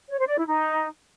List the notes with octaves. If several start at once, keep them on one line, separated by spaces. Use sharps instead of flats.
C#5
C5
D5
E4
D#4